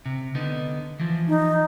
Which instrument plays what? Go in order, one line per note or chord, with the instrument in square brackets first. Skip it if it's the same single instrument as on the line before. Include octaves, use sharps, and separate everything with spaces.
[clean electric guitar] C3
D3 B3 D#4
E3 F3
[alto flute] D#4